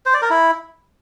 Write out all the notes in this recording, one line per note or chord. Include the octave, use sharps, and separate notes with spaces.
C5
D5
A#4
E4